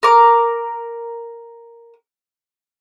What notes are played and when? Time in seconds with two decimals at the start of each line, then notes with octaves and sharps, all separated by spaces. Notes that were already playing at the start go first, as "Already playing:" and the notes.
0.03 A#4 D6